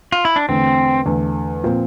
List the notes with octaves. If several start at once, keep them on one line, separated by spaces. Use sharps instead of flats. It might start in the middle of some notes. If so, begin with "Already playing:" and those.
F4
E4
D4
E2 D3 A3 C4
E2 D3 A3
A#2 F3 C4